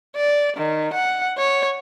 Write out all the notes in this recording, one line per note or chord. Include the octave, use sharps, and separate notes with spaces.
D5
D#3
F#5
C#5